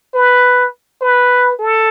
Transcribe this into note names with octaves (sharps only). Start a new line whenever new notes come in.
B4
B4
A4